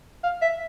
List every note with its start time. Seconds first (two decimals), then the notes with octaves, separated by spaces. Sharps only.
0.24 F5
0.42 E5